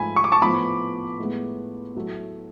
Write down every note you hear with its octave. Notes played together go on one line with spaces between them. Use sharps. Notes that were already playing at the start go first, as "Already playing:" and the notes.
Already playing: G#2 F3 A3 G#5 B5
C#6
D6
A5 C#6
A2 F3 B3 B5 D6
A2 G#3 B3
A2 F#3 A3